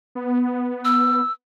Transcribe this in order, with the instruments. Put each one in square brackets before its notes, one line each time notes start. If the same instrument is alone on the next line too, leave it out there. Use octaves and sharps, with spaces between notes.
[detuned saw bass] B3
[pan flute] E6